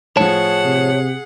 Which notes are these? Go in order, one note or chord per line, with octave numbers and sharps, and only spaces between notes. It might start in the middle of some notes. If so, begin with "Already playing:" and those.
A2 F3 G#4 C#5 F#5 A5
C3